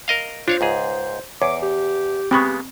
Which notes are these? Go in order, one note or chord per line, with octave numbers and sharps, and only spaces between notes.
A#4 D#5 F5
D4 F4 C5 C#5 F5
C#2 G#2 G#4
E2 C#5 D6
G4
C#3 G#3 B3 C4 G4 B5 C#6